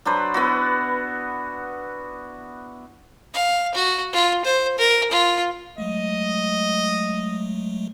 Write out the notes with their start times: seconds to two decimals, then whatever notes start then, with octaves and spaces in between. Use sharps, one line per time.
0.05 F#3 D4 B4 C5
0.34 B3 E4 F#4
3.34 F5
3.75 F#4
4.13 F4
4.45 C5
4.78 A#4
5.11 F4
5.78 F#3 G#3 A3 D#5